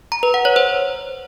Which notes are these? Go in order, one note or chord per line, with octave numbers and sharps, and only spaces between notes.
A#5
B4
F#5
C#5
C5